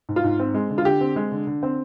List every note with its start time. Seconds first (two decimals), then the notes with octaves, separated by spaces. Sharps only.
0.09 G#2
0.16 F4
0.24 G#2
0.40 C4
0.54 G#3
0.70 D3
0.78 F4
0.85 D3 G4
1.01 C4
1.16 G#3
1.32 D3
1.47 D3
1.63 C4